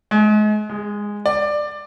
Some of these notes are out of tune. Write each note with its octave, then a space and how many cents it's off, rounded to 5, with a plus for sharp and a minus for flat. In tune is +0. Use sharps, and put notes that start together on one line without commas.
G#3 +35
G#3 -10
D5 +15